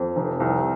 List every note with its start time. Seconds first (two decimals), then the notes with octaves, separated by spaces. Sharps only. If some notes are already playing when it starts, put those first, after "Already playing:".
Already playing: F2
0.16 F1
0.40 C2